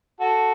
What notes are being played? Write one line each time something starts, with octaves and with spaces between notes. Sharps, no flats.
F#4 A4